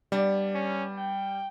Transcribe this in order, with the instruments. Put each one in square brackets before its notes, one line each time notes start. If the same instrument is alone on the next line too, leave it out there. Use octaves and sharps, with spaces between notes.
[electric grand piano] G3 [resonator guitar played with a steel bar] B3 D4 D5
[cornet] C#4
G5